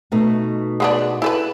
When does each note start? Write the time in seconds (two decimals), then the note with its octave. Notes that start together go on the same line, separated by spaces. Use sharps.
0.12 B2 A3 D#4
0.80 G#3 B3 D4
1.22 E4 A4 B4